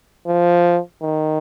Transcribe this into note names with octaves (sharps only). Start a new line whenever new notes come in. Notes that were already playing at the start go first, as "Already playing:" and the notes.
F3
D#3